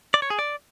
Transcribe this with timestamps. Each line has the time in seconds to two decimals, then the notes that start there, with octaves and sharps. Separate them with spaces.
0.14 D5
0.22 C#5
0.30 G#4
0.39 D5